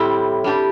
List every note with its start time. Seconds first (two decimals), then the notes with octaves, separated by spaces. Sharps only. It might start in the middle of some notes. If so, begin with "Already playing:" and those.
Already playing: A2 G3 C4 E4
0.44 G3 D4 G4